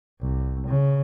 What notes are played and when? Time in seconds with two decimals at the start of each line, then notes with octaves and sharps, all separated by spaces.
0.21 C2
0.67 C#3